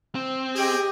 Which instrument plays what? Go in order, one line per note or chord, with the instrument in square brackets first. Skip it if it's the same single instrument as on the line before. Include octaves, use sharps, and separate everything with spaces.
[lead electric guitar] C4
[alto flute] G4 [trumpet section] G#4 D#5 G5